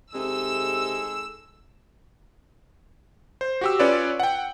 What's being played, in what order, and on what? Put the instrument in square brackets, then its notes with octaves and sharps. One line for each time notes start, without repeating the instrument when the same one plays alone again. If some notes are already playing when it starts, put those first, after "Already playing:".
[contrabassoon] C3 [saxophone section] G#3 D#4 A4 [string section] E6
[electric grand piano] C5
F#4 G4 E6
C#4 F4 B4 C#5 D5
F#5 G5